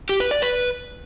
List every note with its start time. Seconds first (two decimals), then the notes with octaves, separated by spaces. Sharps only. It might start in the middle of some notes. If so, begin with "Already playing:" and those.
0.09 G4
0.20 B4
0.31 D5
0.42 B4